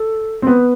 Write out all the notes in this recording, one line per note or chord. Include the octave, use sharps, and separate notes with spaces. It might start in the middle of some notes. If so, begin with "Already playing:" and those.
Already playing: A4
C4
B3 B4